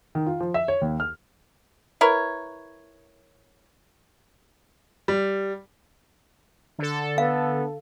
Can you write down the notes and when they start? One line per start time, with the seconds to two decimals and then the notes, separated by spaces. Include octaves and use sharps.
0.15 D#3
0.27 F4
0.40 F3
0.54 E5
0.68 C#5
0.81 D#2
1.00 F6
2.01 E4 A#4 B4 C#5
5.08 G3
6.78 D3 A4
7.18 B3 F5